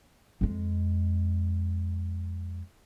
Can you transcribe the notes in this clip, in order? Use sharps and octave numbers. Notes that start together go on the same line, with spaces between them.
F2 G#3